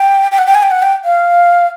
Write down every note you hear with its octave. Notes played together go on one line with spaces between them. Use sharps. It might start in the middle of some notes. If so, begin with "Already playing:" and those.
Already playing: G5
G5
F#5
G5
G#5
G5
F#5
G5
F5